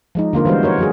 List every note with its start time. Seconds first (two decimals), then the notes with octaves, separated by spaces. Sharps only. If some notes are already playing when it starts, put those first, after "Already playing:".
0.15 F3 G#3 D#4
0.33 D3 A#3 F4 A#4
0.45 E3 G3 G#3 B3 F#4 C5
0.63 F#4 A#4 C#5
0.78 F#3 F#4 G#4